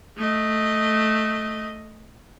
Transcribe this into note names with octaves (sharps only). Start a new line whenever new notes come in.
A3 D#5